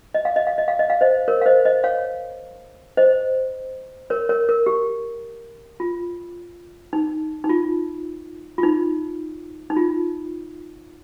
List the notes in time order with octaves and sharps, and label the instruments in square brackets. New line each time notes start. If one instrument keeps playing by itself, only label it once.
[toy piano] D#5
F5
D#5
F5
D#5
F5
D#5
F5
C5 D#5
A#4 C#5
F5
C5 D#5
C5 D#5
C#5 F5
C5 D#5
A#4 C#5
A#4 C#5
A#4
G4
F4
D#4
D#4
F4
F4
D#4
D#4
F4